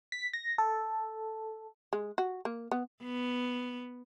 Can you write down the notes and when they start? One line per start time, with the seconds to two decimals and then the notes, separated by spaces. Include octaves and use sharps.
0.12 B6
0.33 A#6
0.58 A4
1.93 G#3
2.18 F#4
2.45 A#3
2.71 B3
3.03 B3